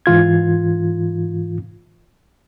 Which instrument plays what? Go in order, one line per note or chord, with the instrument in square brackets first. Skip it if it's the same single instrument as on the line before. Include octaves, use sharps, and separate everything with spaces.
[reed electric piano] G#2 E3 F4 G#6